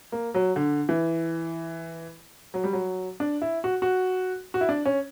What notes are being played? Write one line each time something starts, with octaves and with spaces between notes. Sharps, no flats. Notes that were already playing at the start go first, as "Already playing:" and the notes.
A#3
F#3
D3
E3
F#3
G3
F#3
D4
E4
F#4
F#4
F#4
E4
D4
C#4